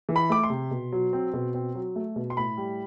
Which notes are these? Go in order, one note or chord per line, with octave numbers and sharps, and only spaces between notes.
E3
B5
A3 D6
C6
C3
B2
F#3
C4
B2
C4
F#3
A3
B2
C6
A2 B5
G3